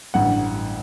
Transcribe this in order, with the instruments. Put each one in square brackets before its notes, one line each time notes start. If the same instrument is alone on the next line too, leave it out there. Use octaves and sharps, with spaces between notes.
[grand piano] A1 G2 D3 F#5